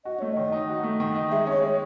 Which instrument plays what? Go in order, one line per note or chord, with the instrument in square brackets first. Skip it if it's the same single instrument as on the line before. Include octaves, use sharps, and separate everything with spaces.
[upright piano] F#4 [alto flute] D#5
[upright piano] A3 [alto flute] C#5
[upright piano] D#3 [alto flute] D#5
[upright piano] D#4
F#4
A3
D#3
D#4
[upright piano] G#3 [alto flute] E5
[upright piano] C#4
[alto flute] C#5
[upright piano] G#3